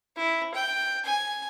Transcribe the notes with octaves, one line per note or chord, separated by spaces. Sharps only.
E4
G5
G#5